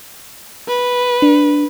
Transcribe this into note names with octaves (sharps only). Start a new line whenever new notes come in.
B4
D4